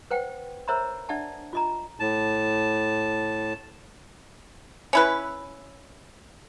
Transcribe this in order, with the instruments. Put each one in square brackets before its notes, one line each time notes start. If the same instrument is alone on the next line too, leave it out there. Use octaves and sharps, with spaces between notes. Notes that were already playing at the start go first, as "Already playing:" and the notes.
[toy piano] B4 C5 F#5 G5
A#4 C5 C#5 E5 A#5 B5
D4 D5 E5 F#5 A5
F4 D#5 A#5
[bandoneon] A2 A5
[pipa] C#4 E4 B4